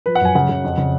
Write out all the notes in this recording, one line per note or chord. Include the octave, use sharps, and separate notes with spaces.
F3 B4
F#5
F#2 G#5
C#3 F#5
C#3
F2
C#3